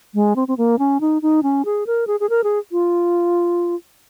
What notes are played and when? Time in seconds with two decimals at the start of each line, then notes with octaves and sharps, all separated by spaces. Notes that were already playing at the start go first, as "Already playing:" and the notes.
0.15 G#3
0.36 C4
0.48 C4
0.58 A#3
0.79 C#4
1.01 D#4
1.22 D#4
1.43 C#4
1.65 G#4
1.87 A#4
2.07 G#4
2.20 G#4
2.30 A#4
2.44 G#4
2.72 F4